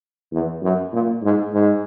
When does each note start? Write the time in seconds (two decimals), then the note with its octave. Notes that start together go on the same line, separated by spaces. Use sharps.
0.32 E2
0.62 F#2
0.93 A#2
1.22 G#2
1.53 G#2